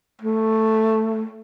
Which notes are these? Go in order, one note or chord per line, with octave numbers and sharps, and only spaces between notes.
A3